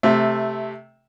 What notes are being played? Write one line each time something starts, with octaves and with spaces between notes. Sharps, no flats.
C3 A3